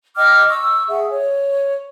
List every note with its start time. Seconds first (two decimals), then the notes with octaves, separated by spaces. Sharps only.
0.16 D#5 G5 D6 F6
0.50 C#6 E6
0.89 G#4 E5 F#5
1.09 C#5